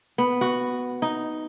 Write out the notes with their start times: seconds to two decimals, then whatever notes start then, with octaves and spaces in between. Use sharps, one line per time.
0.18 B3
0.41 F#4
1.02 D#4